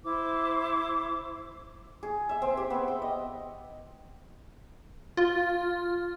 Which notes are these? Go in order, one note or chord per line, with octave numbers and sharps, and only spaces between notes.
E4 C5 D6
G#4
E5
C4
G4
B3
G5
D#5
F4